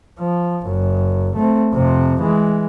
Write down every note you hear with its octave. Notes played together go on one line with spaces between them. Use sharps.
F3
F#1 F#2
A3 C4
F2 C3
E3 G#3